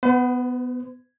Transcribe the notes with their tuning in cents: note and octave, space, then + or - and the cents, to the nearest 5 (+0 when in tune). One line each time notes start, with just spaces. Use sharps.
B3 +10 C5 -45